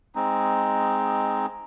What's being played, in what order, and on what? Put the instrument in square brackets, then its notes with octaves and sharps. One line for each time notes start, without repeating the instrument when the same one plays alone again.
[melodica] G#3 C4 D#4